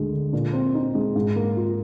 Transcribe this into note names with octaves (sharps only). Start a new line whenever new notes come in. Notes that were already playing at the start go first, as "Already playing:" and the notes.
Already playing: D2 G#3
D3
A#2
C4
D#4
G#3
G#2
A#3
F4